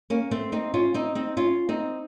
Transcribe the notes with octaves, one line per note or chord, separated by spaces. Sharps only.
A#3 C#4
A3 C4
C4 D#4
C#4 F4
C4 D#4
C4 D#4
C#4 F4
C4 D#4